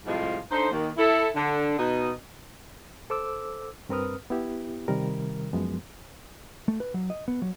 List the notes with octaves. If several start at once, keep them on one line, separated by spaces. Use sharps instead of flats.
A2 C3 F3 G3 G#3 F4
D3 D#4 C5
D#2 D#3
E4 A4
D3
B2 D#4 D#5
A4 C5 D6 E6
G2 C4 A#4 B4 D#6 F6
B3 E4 G4
C3 D#3 G3 A#4
F#2 F3 G#3 B3
A3
B4
F#3
D#5
B3
F#3